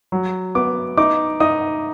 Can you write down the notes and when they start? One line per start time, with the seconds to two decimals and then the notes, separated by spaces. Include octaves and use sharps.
0.12 F#3
0.55 B3 D6
0.97 D#4 D6
1.40 D#4 D#6